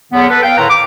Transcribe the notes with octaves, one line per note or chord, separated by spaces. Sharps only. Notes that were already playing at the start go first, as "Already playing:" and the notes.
E2 D3 F#3 B3
A4 B4
F5 G5
A2 D3 D#3 B4 A#5
D6